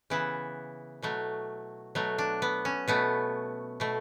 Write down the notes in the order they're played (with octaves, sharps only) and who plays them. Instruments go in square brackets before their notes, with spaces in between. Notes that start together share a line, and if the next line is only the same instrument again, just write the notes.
[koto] C#3 E3 B3 E4
B2 F#3 A3
B2 F#3 A3
D4
B3
C#4
B2 A3 B3
B2 A3